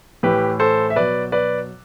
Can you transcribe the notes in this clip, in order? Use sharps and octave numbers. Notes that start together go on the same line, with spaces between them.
A2 E3 G4 B4
A4 C5
E5
B2 F#3 B4 D5
B4 D5